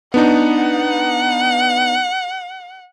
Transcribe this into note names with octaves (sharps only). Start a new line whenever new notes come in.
B3 D4 D#4 F#5